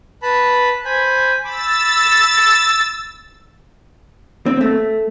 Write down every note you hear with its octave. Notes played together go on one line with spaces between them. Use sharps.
B4 A5 B5
C5 G#5 B5
B5 D6 E6 A6
C4
A3